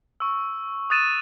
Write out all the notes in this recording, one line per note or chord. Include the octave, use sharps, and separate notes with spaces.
C#6 E6
D#6 F#6 A6 D#7 E7